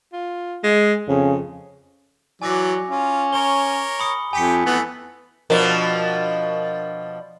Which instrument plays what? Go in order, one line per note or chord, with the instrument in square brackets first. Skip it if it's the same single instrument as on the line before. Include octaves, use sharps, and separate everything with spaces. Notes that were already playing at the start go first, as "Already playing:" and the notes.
[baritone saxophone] F4
G#3
[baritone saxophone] F2 [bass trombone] C#3
[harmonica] E3 D5 [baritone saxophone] F#3 [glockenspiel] G#5 D6 A#6
[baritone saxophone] C#4 [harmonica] F4
[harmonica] A#4 C#5 [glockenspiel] G7
[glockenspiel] B5 D#6 C#7
[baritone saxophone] F2 [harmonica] G4 [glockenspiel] G#5 B6 C#7
[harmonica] E3 A3 [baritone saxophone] B3
[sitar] B2 F3 D4 [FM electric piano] A#4